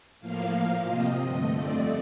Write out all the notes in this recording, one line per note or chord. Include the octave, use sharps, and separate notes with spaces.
A2 F3 A#3 F5
A#2 F3 A#3
C3 F3 C4 D#5
G2 D3 A3
F2 D3 A3 C4 D5